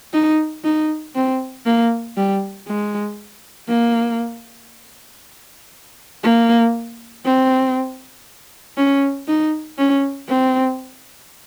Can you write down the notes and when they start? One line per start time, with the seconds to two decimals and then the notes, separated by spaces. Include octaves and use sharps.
0.13 D#4
0.64 D#4
1.15 C4
1.66 A#3
2.16 G3
2.67 G#3
3.69 A#3
6.23 A#3
7.25 C4
8.77 C#4
9.28 D#4
9.78 C#4
10.29 C4